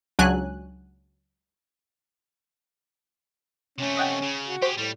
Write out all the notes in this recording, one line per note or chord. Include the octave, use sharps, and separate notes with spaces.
C#2 F#3 D4 G#5 F#6
C3 A3 C#4
D#5 F#5 G5
C#3
F#4
G4 G#4 C5 C#6
A2 G3